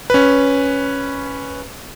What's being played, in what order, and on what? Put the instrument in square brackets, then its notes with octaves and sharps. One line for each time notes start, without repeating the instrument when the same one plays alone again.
[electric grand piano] C#4 B4